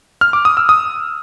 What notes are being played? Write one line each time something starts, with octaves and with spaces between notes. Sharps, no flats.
F6
D6
D#6
E6
D#6